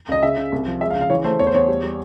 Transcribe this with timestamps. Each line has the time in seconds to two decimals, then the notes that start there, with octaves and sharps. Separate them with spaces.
0.09 C#2 D#5
0.23 C#3 E5
0.37 C#3
0.52 C2
0.66 F3
0.81 G#3 E5
0.90 F5
0.95 C#3
1.01 F5
1.10 E3 C#5
1.24 A3 C5
1.39 E2 C#5
1.47 C5
1.54 E2 C#5
1.68 G3
1.84 G3